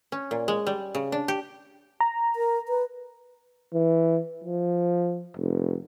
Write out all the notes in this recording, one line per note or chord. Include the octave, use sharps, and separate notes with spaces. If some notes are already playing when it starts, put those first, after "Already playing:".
C#4
A#2
G#3
G3
C#3
D4
G4
A#5
A#4
B4
E3
F3
F1